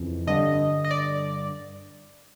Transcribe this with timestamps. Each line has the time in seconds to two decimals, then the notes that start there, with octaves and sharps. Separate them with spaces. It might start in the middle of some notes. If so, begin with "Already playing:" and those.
Already playing: F2 C#3 E3
0.27 G2 D3 D#5
0.84 D#5
0.91 D5